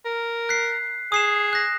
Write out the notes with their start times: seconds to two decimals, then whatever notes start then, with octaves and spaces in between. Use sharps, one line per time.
0.05 A#4
0.49 F#6 B6 C7
1.12 G#4 D#6 C7 E7
1.53 F#6 A#6